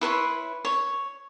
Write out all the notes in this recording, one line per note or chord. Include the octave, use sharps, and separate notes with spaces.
E4 B4 C#5 C6
C#5